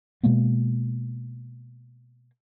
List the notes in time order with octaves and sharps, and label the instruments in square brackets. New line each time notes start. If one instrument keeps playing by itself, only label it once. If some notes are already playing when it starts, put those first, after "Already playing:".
[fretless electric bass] B2 G#3 A#3 B3